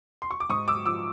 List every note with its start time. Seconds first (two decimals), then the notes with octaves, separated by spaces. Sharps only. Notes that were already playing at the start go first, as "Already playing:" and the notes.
0.22 C6
0.31 C#6
0.40 D6
0.49 G#2 C#6 D#6
0.68 D6 E6
0.85 F3 D6 E6